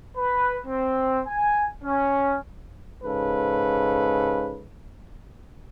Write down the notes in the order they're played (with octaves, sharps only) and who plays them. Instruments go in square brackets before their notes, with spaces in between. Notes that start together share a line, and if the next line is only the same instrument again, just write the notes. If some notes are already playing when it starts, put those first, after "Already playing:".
[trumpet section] B4
C4
G#5
C#4
[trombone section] G#2 C#3 A4 B4